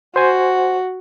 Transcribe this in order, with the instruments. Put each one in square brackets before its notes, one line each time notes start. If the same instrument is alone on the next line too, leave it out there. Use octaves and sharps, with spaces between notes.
[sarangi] F#4 [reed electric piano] C5 G#5